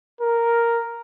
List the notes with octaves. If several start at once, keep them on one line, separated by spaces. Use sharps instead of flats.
A#4